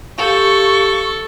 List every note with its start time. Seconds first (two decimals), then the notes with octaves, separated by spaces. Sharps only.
0.18 G4 A4 F5 C#6